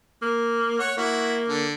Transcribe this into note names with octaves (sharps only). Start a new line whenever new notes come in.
A#3
C#5 F#5
A#3 E4 F#4
D3